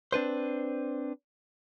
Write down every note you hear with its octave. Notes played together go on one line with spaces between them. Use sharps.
C4 D4 B4 C5